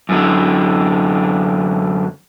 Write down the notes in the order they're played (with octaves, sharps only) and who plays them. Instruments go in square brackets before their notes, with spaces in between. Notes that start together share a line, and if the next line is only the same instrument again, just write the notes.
[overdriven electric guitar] F#2 D3